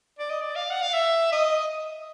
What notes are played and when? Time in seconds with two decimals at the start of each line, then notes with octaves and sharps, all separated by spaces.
0.19 D5
0.30 D#5
0.41 D5
0.56 F5
0.71 F#5
0.82 F5
0.94 E5
1.32 D#5